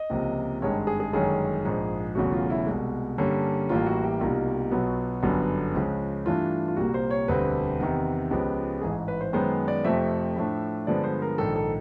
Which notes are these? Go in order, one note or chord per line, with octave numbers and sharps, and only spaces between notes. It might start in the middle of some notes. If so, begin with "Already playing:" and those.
Already playing: D#5
C#2 C3 F3 A#3
G#1 G2 D#3 G#3 C#5
G#4
G#4
G1 F#2 D#3 G#3 C#4 G#4
A#1 G#2 F3
E1 E2 C#3 F#3 A3 F#4
F4
E4
C2 B2 G#3
G2 D3 G3 A#3 C#4
A1 A2 E3 G3 A#3 F4
F#4
G4
C2 B2 G3 A#3 D#4 F4
B1 B2 F#3 B3
G1 F#2 D3 F#3 B3
C#2 C#3 F3 G#3
G2 E3 A3 D4 F4
F4
C2 A#2 G3 A#3 F#4
C5
C#5
E1 D2 D3 G3 C4 B4
E2 C3 D#3
C#2 C#3 F3 G#3 B3 G4
A1 G#2 E3 G#4
B4
C5
F#2 D#3 G#3 B3 C5
D5
F2 C3 F3 A3 C4 E5
A2 F3 A3 D4
G2 D3 F3 G#3 B3 D5
C5
A#4
A#1 G#2 D#3 A4
A4